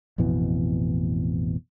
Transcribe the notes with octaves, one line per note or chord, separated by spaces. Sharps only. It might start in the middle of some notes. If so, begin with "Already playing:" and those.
A1 F2 B2 E3